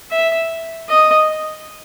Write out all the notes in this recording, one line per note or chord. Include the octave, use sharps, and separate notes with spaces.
E5
D#5